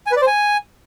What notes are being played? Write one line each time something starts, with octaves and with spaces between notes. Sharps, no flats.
G#5
B4
D5
C5
G#5